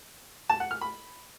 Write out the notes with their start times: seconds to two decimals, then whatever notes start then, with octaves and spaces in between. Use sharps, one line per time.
0.49 A5
0.60 F#5
0.71 F6
0.81 B5